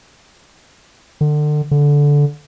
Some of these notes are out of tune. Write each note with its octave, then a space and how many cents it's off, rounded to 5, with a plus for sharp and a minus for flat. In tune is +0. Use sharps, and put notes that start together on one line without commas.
D3 +30
D3 -15